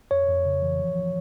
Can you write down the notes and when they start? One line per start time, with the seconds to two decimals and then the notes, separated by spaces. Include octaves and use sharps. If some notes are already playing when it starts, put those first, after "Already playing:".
0.11 F2 C#5
0.29 F2
0.45 C#3
0.62 E3
0.79 F3
0.96 F3